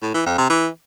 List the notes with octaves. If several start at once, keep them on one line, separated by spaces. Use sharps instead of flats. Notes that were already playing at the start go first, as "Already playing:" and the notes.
A2
E3
F2
C3
E3